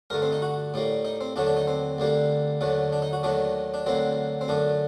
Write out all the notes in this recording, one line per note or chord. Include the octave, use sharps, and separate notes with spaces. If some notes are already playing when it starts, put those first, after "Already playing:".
G2 D3 A3 A#4
C4
D#4
F#4
A2 G3 A#3
D#4
C4
D#2 D3 F#3 A3 D4
D4
D#4
C4
D2 D3 G3 A#3
D#2 D3 F#3 A3
D4
D#4
F#4
D#2 D#3 F#3 A3 D4
D4
D2 D3 F#3 A#3 C4
C4
F#2 D3 A3 D4